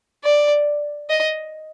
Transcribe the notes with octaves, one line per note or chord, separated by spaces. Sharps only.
D5
D#5